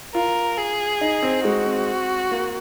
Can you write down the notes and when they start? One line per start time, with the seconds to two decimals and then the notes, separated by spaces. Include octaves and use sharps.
0.15 F4 A#4
0.57 G#4
1.01 D#4
1.23 C4
1.44 G#3 F#4
1.66 C4
2.32 A#3